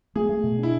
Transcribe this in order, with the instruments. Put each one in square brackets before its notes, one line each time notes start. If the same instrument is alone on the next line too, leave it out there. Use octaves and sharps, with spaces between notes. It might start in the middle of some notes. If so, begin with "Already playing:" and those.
[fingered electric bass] A3 [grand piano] G#4
[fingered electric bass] A3
B2
[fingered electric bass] D4 [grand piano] E4